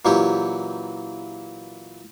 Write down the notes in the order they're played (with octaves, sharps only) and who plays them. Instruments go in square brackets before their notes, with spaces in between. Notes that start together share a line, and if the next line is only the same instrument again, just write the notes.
[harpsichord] A#2 E3 F#3 C#4 G4